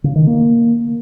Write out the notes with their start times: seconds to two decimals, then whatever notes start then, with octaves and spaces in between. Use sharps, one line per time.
0.04 C#3
0.15 D#3
0.27 A#3